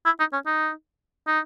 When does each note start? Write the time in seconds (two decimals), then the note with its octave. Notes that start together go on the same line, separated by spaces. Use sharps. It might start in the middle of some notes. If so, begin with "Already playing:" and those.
0.05 E4
0.19 D#4
0.33 C#4
0.46 D#4
1.27 D#4